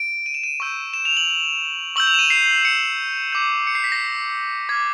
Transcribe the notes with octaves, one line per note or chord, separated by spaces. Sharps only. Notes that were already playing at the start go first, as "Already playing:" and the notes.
Already playing: D7
D#7
E7
D#7
C#6 E6 G6
E7
F7
F#7
C#6 E6 G6 F#7
F7
E7
D#7
C7
C#7
D6 G6
C#7
C7
B6
A#6
D6 F6 G#6